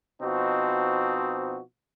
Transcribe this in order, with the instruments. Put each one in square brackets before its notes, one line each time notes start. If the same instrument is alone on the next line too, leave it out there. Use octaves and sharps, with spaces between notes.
[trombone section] B2 F3 C4 D#4 F#4